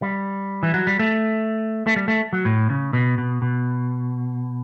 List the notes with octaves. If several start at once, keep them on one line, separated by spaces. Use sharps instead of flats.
G3
E3
F#3
G3
A3
A3
G3
A3
F#3
A2
C#3
B2
B2
B2